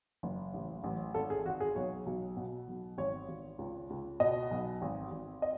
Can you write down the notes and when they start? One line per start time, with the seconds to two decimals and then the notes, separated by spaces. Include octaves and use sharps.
0.23 F#1
0.54 A1
0.84 A1
1.14 G#1 A4
1.30 G#4
1.45 G#1 F#4
1.61 G#4
1.75 B1 C#5
2.06 B1
2.37 B2
2.68 B1
2.98 G#1 C#5
3.28 G#1
3.58 C#2
3.90 C#2
4.20 B2 D#5
4.51 B1
4.82 G#1
5.11 G#1
5.42 D#5